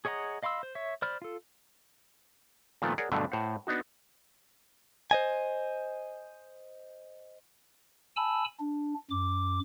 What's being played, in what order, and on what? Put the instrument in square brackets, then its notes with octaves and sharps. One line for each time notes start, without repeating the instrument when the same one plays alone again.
[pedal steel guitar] G#4 C#5 D#5 F#5 A#5
D#5 F5 B5 C6 E6
C5
C#5 E5
C5 D5 B5 F6
F4 A4
[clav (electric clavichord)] A#2 D#3 F3 A3 B3
G#4 A#4 C#5 D5 F#5
G2 B2 D3 F#3 A3 D4
A2 C5 F#5
B3 D4 D#4 F#4
[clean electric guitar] C5 D#5 G#5
[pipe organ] G#5 A5 B5 E6
D4
F#2 D6